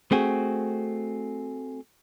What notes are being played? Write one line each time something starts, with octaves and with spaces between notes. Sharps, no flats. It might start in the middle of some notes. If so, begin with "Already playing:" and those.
A3 C4 F#4 G#4